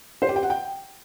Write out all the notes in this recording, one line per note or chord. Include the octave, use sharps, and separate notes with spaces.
C5
G4
G5
F#5
G5